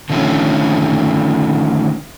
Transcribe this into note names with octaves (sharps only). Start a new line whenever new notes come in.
D3 D#3 F3 A3 C#4